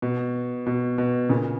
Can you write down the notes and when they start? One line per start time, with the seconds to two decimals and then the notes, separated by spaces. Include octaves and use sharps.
0.02 B2
0.67 B2
0.98 B2
1.29 A#2 C#3